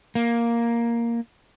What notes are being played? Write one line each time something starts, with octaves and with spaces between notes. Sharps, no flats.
A#3